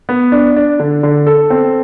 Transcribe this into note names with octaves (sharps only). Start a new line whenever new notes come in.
B3
D4
D4
D3
D3
A4
C4